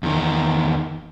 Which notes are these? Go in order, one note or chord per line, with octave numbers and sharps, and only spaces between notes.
E2 D#3